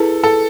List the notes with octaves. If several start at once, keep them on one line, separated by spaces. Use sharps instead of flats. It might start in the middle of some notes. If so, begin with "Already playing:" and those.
Already playing: E4 G#4 A4 B4
A4